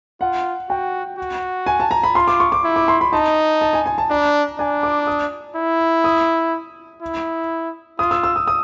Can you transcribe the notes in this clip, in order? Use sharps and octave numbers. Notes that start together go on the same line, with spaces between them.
F4 F#5
F#4 G5
F#4
G#5
A5
A#5
B5
F4 C6
D6
C#6
D6
E4
D6
C6
B5
D#4 A5
A5
G#5
G#5
A5
D4 A#5
D4 G#5
D6
D#6
E4
D#6
E4
F4 D#6
E6
E6
D#6
D#6